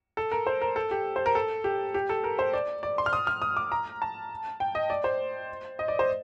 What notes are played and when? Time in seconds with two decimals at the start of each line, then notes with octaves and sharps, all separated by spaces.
0.17 A4
0.32 A#4
0.47 C5
0.61 A#4
0.76 A4
0.91 G4
1.16 C5
1.26 A#4
1.35 A4
1.64 G4
1.94 G4
2.09 A4
2.24 A#4
2.39 C5
2.53 D5
2.83 D5
2.98 C6
3.06 F6
3.13 D#6
3.27 F6
3.42 D#6
3.57 D6
3.72 A#5
4.02 A5
4.60 G5
4.75 D#5
4.90 D5
5.04 C5
5.79 D#5
5.88 D5
5.99 C5